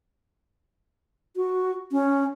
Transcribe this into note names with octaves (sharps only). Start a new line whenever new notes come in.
F#4
C#4